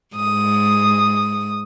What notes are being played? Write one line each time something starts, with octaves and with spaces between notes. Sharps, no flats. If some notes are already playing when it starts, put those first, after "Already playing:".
G#2 D#6